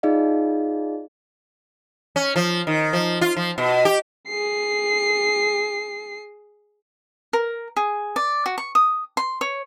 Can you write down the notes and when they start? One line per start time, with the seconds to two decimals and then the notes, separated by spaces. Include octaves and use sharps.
0.03 D#4 F4 G#4 D5 D#5 F5
2.16 C#4
2.36 F3
2.67 D#3
2.93 F3
3.21 F4
3.36 F3
3.58 B2
3.85 G4
4.28 G#4 C7
7.33 A#4
7.76 G#4
8.16 D5
8.46 F#4
8.58 C#6
8.75 D#6
9.17 C6
9.41 C#5